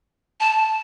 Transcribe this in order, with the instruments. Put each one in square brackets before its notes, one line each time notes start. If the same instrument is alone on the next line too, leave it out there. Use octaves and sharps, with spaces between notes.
[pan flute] A5